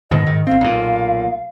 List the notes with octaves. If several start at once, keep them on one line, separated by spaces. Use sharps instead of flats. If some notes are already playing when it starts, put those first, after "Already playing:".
G#2 B2 D#3 D#5
G#2 D#3
G1 C4 F5
B1 A#2